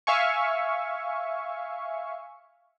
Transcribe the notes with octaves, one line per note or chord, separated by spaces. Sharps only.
E5 F5 G#5 C#6